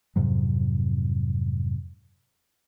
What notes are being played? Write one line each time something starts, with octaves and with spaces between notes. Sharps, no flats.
F2 G#2 C3 F#3